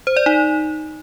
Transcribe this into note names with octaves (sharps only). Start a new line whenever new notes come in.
C5
D5
D#4